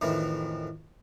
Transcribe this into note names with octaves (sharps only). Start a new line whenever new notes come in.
F2 A2 D#3 E3